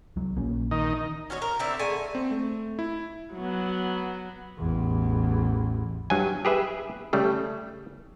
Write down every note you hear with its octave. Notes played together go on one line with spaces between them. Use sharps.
C2 F#3
A#1 A#3 C#4
D#3 D#5
C#4 F#4 A#4 C#5
A#4
D3 C4 E4
D3 G#3 A3 G#5
C4
A3
E4
F#3 B3
A1 E2
G2 F#3 G#5
G4 G#4 B4 E5
C#3 G3 A3